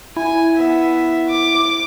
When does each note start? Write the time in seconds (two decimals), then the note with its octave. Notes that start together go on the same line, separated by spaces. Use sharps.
0.17 E4 G#5
0.57 B3 E5
1.29 D6